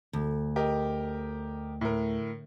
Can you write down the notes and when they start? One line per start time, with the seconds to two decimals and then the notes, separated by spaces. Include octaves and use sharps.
0.13 D2
0.56 G4 A#4 D#5
1.81 A2 A#4